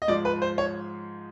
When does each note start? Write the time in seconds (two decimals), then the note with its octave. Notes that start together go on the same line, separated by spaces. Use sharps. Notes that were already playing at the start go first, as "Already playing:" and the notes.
0.02 D#5
0.08 G#2 F3 D5
0.25 B4
0.42 C5
0.58 C#5